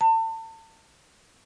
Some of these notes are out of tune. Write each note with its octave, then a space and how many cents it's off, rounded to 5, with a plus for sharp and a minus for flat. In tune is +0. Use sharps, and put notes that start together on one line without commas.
A5 +35